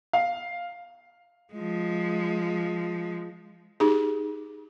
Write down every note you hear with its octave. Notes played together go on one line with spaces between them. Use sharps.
F5
F3 G#3
D#4 G4 G#4